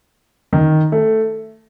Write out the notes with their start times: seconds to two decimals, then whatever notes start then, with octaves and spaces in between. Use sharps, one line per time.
0.53 D#3
0.92 A3